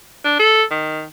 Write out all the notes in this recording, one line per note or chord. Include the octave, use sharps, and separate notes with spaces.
D4
A4
D#3